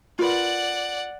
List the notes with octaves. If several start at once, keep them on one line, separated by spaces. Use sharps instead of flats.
F4 A#4 B4 D5 F#5